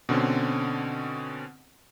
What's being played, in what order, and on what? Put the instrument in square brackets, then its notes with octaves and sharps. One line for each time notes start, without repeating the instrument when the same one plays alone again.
[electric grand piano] B2 D3 C4 C#4